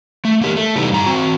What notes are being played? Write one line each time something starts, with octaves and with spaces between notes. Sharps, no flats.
A3
A#3 G4 A#4
A3
C3 E3 G3 B3 D#4
G2 A#5
C4 F#4